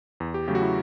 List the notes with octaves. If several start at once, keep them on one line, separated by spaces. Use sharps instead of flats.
E2
G4
C#3 F#3 A3 G4
F#4
E4